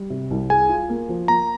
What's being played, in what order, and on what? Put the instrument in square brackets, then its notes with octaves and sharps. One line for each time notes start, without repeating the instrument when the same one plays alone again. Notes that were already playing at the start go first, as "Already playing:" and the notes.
Already playing: [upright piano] G3
C3
C2
[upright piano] G#4 [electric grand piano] G#5
[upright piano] F4
A#3
F3
[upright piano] A#3 [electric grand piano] A#5